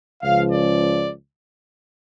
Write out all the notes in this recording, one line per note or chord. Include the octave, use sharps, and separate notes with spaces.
C#2 C#3 F3 F5
D5